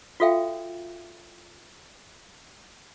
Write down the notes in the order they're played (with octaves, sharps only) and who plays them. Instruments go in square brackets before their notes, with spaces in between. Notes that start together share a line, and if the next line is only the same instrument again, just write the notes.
[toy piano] F4 F#4 A4 E5 F5 G5